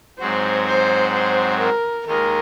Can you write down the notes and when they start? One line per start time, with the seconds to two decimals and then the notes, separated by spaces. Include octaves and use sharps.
0.19 G#2 F#3 C4 F#4 C5
0.67 C5
1.14 C5
1.59 A#4
2.07 D#2 D#3 G#3 D#4 A#4